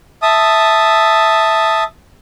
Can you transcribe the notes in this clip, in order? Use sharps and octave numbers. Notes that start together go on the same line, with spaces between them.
E5 A5 D#6